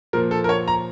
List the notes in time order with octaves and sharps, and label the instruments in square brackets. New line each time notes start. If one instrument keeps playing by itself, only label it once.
[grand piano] A#2 F3 A#4
A4
A#4
C#5
A#5